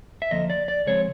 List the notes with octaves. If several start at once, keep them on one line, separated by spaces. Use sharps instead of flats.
E5
F2 D3 F3 A#3 D#5
D5
D5
C#3 F3 G#3 C4 C#5